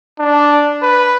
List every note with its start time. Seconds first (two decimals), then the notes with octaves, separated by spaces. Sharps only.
0.19 D4
0.82 B4